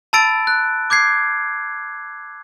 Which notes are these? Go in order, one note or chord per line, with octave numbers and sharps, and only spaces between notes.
A5 B5 E6 A6 D7
F#6
D6 G6 G#6 C7